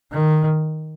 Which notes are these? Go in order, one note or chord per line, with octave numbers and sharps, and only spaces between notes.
D#3